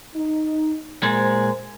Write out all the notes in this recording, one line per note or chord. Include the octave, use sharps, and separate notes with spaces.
D#4
A#2 G#3 C5